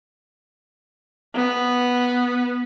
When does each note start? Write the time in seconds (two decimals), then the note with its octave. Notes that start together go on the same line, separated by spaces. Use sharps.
1.35 B3